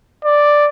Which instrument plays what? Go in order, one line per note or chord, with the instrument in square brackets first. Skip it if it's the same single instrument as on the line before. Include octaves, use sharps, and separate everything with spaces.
[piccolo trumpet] D5